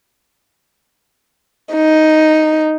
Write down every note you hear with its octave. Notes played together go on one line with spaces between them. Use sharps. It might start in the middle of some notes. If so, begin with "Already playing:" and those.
D#4